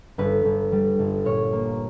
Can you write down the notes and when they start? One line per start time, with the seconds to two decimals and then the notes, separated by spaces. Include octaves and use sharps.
0.18 G1 B4
0.45 G1
0.72 G3
0.99 G1
1.25 A#2 C#5
1.53 A#3